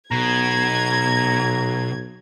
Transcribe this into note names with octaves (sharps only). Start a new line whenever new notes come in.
B1 B2 A#5 G#6